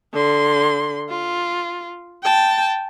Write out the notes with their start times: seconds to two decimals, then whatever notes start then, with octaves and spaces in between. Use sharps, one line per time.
0.14 D3 C6
1.10 F4
2.24 G5 A5